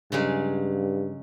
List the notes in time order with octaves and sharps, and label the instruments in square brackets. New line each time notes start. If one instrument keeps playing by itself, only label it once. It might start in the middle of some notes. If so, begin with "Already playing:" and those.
[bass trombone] G2 [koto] C#3 F#3 G#3